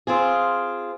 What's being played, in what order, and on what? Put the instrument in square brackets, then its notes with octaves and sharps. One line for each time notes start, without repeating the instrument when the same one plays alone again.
[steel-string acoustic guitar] C4 F4 G#4